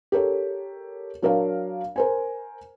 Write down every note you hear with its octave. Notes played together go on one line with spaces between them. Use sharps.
G4 A4 A#4 C#5
F#3 D4 A#4 C#5 F5
A#4 C5 G#5